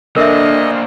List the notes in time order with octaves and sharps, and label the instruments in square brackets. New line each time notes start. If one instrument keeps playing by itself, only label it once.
[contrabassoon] D3 [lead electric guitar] A#3 D4 [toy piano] A#4 E5 [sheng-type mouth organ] D#5